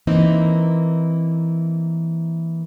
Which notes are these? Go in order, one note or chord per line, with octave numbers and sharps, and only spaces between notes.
E3 A#3 C4 D#4